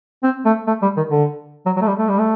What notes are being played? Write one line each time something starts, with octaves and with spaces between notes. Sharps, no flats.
C4
A3
A3
G3
D#3
D3
F#3
F#3
A3
G3
A3
G3
A3